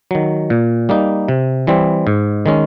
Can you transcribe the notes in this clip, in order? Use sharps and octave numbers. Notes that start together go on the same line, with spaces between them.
D#3 F#3
A#2
G3 A#3 D#4
C3
E3 G3 C4
G#2
D#3 G#3 C#4